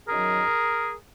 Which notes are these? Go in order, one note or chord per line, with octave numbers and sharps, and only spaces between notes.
F#2 D#3 F#3 G#4 A#4